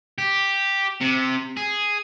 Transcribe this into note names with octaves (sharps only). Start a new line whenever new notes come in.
G4
C3
G#4